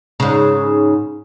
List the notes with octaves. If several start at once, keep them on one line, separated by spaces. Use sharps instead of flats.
G#2 C#3